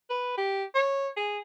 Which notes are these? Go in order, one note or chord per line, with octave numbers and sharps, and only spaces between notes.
B4
G4
C#5
G#4